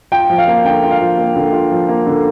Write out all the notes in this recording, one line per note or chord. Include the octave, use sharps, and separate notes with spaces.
F4 G5
F3
F5
A#3
D3 G5
F4
F5
F3
A#3
D3
F4
F3
A#3
D3